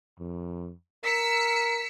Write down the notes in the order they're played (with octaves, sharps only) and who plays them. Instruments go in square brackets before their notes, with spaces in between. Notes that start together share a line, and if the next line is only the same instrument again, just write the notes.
[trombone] F2
[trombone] A#4 [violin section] E6 B6 C#7